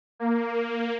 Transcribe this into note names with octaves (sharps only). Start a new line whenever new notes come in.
A#3